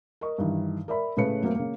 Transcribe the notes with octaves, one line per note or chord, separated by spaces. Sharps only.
A#4 D#5 C#6
G2 D#3 E3
A#4 D5 E5 B5
A2 C#3 A3 B4 C#7
F#3 A3 A#3 C4
C#3 A#3